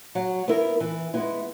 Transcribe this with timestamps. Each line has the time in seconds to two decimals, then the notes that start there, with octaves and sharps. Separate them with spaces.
0.15 F#3
0.48 B3 E4 A#4
0.80 E3
1.14 G#3 B3 E4